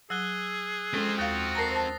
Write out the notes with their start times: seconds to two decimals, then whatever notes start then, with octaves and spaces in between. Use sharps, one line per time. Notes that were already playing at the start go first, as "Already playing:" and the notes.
0.10 F#3 G#4 E6 F#6 G7
0.94 G#3 C4 C#4 F4 A4
1.18 D#2 F#4 F5 D#6 A6
1.55 A#4 A5 A#5 A#6 C7
1.71 C5 A5